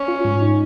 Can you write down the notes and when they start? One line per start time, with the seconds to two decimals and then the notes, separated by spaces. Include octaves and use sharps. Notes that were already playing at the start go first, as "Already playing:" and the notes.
Already playing: C#4
0.08 F4
0.25 G#2
0.41 D#4